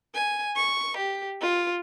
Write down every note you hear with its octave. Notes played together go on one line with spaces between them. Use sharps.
G#5
C#6
G4
F4